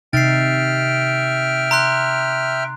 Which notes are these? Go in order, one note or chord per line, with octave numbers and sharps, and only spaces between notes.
C3 D#4 E5 G5 F6 A6 C7
A#5 C6 F#6